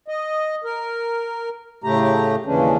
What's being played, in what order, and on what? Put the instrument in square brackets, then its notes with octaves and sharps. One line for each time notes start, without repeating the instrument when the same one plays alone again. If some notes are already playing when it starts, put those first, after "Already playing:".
[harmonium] D#5
A#4
A2 C#3 A3 G4 A#5
D#2 C#3 E3 G#3 C#4 D4